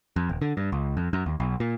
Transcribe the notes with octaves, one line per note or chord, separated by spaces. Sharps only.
F2
D#1
D3
G2
C#2
F2
F#2
D#2
B1
A#2